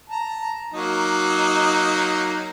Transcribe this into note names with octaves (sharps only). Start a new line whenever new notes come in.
A5 A#5
F#3 A#3 D#4